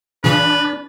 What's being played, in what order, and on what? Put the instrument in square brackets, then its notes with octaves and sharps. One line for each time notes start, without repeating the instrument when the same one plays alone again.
[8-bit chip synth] A#2 C#3 E3 [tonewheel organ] D4 [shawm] B4